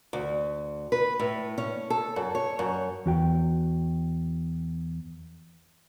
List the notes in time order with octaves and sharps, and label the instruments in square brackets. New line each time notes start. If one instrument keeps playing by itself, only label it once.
[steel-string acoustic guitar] D2
B4
A2
C#4
A4
F#2
C#5
F#2
[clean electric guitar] E2 F#4 G5